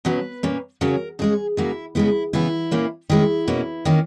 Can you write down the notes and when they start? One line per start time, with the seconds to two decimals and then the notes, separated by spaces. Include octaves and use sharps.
0.05 B2 F#3 C#4 B4
0.43 A#2 A#3 C#4
0.81 C#3 F#3 C#4 A#4
1.19 C#3 G#3 C#4 G#4
1.57 C#3 F#3 A#3 E4
1.95 C#3 G#3 B3 E4
2.33 C#3 E3 B3 E4
2.71 A#2 A#3 C#4
3.09 D#3 G#3 C#4 E4
3.48 B2 A#3 C#4
3.85 D#3 A#3 C#4